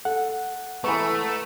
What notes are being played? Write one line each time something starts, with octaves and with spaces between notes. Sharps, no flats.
A4 F#5
E3 A3 B3 B4 A#5 C#6